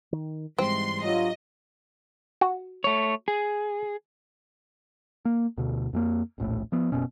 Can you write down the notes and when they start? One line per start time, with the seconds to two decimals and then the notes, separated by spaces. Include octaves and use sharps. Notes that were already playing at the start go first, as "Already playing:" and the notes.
0.12 D#3
0.58 G#2 E3 G3 G#3 C4 C6
1.04 G2 F#3 F4 D#5
2.41 F#4
2.84 A3 C#5
3.28 G#4
5.25 A#3
5.58 D2 B2
5.93 F2 A3 A#3
6.38 D#1 A#1 A2
6.72 F3 B3
6.92 F#1 B2 C#4